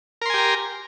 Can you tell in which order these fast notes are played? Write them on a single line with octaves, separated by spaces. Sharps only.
A#4 C6 G#5 G4 A#5